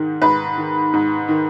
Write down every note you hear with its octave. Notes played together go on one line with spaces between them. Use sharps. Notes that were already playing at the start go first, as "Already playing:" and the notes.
Already playing: G#2 D#3
G#2 B4
D#3
G#2
D#3